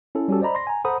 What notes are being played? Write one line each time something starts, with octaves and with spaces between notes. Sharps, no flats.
C#4 E4 A4
G3 C#4 F#4 G4 A4
C5 D5 D#5 A#5 B5
C6 A#6
G#5 A#5
A4 C5 F#5 A#5 B5 D#6